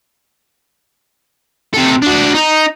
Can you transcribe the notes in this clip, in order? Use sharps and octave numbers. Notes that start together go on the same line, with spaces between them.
C3 A4
D4 F#4
D#4